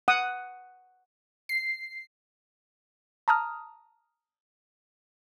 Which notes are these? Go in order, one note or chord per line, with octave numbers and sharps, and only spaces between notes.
F#5 D#6
C7
A5 A#5 D#6 F6